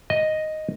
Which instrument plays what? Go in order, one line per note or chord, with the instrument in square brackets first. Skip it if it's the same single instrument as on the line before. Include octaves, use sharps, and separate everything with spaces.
[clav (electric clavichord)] D#5